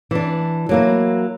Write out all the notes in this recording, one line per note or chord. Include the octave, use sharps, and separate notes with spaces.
E3 D4
F#3 A#3 E4